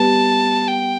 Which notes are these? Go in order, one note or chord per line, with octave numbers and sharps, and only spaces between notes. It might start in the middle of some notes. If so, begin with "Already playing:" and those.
Already playing: G3 B3 A5
G5